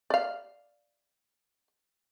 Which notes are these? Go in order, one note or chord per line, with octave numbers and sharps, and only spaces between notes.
D5 F5